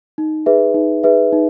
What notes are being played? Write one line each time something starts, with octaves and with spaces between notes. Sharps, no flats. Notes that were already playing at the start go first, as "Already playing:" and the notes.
D#4
G#4 B4 E5
D#4
G#4 B4 E5
D#4